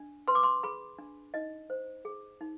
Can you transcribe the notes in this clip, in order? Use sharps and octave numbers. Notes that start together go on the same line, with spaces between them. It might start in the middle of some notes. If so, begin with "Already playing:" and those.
Already playing: D4
B4 C6
D6
C6
G#4 B5
D4
D#4 D#5
C5
G#4
D#4